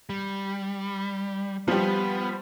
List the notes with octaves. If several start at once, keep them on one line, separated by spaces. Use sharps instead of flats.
G3
F3 G3 B3